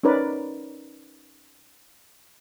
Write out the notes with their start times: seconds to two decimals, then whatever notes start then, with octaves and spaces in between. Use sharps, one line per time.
0.03 C#4 D#4 A#4 B4 D5